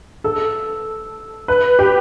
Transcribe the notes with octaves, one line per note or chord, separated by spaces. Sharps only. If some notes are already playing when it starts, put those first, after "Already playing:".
A4
B4
G4